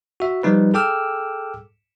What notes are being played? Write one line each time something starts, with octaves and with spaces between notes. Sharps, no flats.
F#4 E5
F3 G3 D#4 B4
G#4 A4 G5 D6 E6 F6